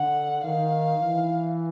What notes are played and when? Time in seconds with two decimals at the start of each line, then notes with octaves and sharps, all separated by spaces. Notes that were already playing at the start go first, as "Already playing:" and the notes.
Already playing: D3 F#5
0.44 D#3 F5
1.00 E3